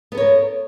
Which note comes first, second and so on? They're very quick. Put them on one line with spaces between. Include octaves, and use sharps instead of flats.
B3 A4 C#5 A#4